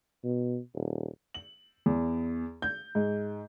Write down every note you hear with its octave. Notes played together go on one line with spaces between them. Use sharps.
B2
D#1
F#7
E2
G6
G#2